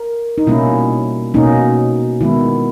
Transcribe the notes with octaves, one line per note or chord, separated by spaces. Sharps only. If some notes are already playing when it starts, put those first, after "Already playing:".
Already playing: A#4
D#4
B2 G3 A#3 C#4 E4
B2 A#3 C#4 D#4
D#3 G#3 B3 E4